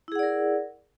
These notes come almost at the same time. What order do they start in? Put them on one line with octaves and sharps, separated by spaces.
E4 G#4 F#5 D5 A#4